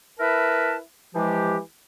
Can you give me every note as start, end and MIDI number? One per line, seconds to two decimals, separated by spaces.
0.20 0.78 64
0.20 0.78 70
0.20 0.78 71
0.20 0.78 76
0.20 0.78 81
1.15 1.58 52
1.15 1.58 53
1.15 1.58 56
1.15 1.58 67